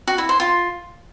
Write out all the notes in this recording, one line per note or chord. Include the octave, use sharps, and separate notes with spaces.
F#4
E4
C5
F4